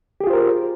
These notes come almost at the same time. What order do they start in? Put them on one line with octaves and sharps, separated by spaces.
G4 G#4 F4 C5 A#4